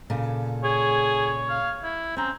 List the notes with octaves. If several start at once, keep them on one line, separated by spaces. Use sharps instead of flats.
A#2 C#3 A4
G#4 C#5
F5
E4
C4 C#4 A#5